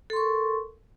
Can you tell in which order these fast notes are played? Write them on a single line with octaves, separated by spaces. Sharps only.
A4 C6 C#6 A#4